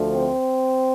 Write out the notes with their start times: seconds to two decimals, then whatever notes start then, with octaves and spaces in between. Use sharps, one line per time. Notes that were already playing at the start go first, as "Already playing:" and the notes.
Already playing: D2 D3 F3 A3
0.12 C4